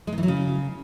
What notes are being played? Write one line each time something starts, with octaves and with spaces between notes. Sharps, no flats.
G#3
D#3
E3
F#3
C#3